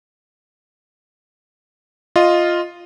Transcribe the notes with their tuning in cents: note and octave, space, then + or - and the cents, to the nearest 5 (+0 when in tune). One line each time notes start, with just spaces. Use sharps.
F4 +0 D#5 -5